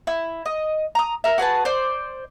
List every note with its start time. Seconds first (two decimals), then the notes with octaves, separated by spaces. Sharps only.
0.07 E4
0.46 D#5
0.95 A#5 D#6
1.24 A#4 E5
1.38 F#4 G#4 B4 A5
1.65 C5 D5